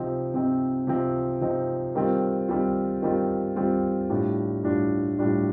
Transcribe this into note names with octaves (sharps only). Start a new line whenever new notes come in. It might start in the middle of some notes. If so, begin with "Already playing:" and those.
Already playing: C3 F3 C4 D#4
C3 F3 C4 D#4
C3 F3 C4 D#4
C3 F3 C4 D#4
D#3 G3 C4 F4
D#3 G3 C4 F4
D#3 G3 C4 F4
D#3 G3 C4 F4
A2 G3 D4 F4
A2 G3 D4 F4
A2 G3 D4 F4